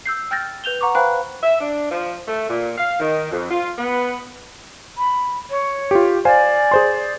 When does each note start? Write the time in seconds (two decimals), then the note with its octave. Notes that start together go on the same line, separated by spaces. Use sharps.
0.05 E6 G6 C7
0.31 G5 F6 G6 A6 A#6
0.64 B4 G6 F7 G7
0.81 F#5 A#5 C#6 D6
0.95 B4 C5 F5 G5 B5 F#6
1.42 E5
1.59 D4
1.90 F3
2.27 A3
2.48 A#2
2.78 F5
3.00 D#3
3.31 F2
3.50 F4
3.78 B3
4.97 B5
5.50 C#5
5.91 F4 G4
6.25 C5 D5 F5 G#5
6.71 G#4 C5 C6